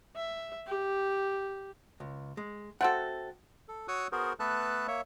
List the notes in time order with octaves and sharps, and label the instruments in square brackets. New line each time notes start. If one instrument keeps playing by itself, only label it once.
[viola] E5
G4
[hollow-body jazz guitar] C#2
G#3
[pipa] A3 C4 A4 [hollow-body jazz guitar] F#4 F#5
[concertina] A4
F#4 C#5 C#6 D#6 E6 F#6
B3 F#4 G#4 A#4 C5
A3 B3 A4 B4 A5 F#6
A#3 C#5 E5